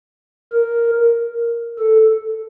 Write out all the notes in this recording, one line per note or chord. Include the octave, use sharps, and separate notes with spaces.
A#4
A4